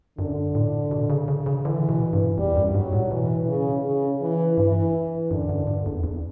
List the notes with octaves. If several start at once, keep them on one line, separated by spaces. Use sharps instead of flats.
F#2 D3
A2
B2
C#3
C#3
C#3
D3 E3
B2
G2
E2 G3
F#2
G2 F#3
A2
B2 E3
C#3
C#3
E3
G2 E3
F#2 D3
F#2
G2
E2
E2